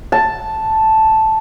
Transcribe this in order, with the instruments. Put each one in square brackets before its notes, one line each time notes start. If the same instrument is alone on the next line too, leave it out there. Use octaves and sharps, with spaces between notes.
[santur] A5